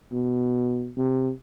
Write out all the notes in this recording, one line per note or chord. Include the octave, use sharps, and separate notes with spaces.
B2
C3